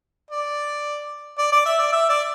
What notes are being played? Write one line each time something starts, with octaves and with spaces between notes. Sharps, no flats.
D5
D5
D5
E5
D5
E5
D5